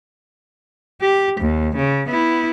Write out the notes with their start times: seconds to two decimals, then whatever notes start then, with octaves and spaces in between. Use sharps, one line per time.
1.01 G4
1.41 D#2
1.76 C#3
2.09 B3 E4